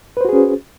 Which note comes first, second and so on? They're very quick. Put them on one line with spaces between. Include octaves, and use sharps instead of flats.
B4 C5 F#4 G#4 C#4